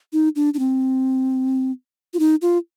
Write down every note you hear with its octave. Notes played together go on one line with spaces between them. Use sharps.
D#4
D4
D4
C4
F4
D#4
F4